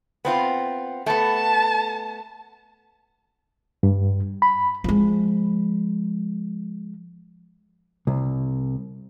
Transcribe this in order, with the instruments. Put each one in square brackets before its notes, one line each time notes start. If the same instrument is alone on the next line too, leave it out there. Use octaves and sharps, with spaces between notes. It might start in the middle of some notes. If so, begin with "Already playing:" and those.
[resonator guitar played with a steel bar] B3 C4 F4
[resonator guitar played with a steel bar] A3 B3 [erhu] A5
[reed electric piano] G2
B5
[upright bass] F3 G#3
[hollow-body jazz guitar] C2